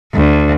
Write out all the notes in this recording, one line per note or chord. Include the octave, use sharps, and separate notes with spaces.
D2